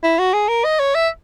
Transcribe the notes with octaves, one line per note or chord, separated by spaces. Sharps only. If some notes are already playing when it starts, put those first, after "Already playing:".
E4
F#4
G#4
A#4
D#5
C#5
E5